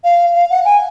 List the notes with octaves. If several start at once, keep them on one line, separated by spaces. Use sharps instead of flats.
F5
F5
F#5
G#5